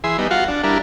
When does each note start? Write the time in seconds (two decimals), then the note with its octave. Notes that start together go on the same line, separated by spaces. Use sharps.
0.04 E3 G#4 E5 C6
0.18 G3 B3 D#4
0.31 F4 F#4 F5 F#5
0.48 D4
0.64 G3 D4 E4 A#4